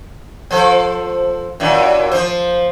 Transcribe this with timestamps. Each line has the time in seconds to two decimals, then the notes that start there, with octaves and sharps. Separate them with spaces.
0.51 F3 A4 C5
1.60 F#2 A#2 E3
2.11 F3 C5